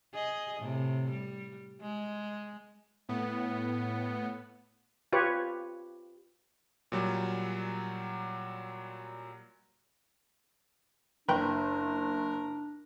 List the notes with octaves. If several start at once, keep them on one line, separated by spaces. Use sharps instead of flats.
G#4 D#5
A2 C3
G3
G#3
A2 B3
F4 G4 B4 C#5
A#2 F#3 G3
F#1 D4 A#4 B4 G5